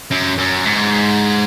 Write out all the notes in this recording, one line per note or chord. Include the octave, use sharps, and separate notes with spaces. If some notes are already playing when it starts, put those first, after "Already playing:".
F#2
F#2
G#2